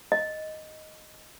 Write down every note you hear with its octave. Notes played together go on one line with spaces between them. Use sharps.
D#5